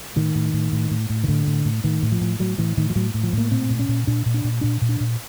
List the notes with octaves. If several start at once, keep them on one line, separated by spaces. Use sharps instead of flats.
A2 D#3
A2
A2
A2
A2
A2
D#3
A2 D3
A2
A2
A2 D#3
A2
F3
A2
A2 F#3
A2 E3
A2 D#3
F3
A2 F#3
A2
F3
A2 A#3
A#2 C4
A#2
C#4
A#2
A#2 D4
A#2
D4
A#2
A#2 D4
A#2
D4
A#2